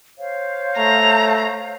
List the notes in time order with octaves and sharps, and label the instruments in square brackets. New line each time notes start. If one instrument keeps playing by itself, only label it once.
[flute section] C5 C#5 F5
[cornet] A3 [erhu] A#5